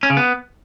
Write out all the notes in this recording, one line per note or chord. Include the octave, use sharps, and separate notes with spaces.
C#4
C#3
B3